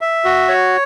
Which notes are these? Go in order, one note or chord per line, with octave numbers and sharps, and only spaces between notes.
E5
F#4
C#5